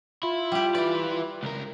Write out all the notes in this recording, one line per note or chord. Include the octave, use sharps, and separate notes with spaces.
E4 F4
G3 G4
E4 B4 D5
C#2 A#4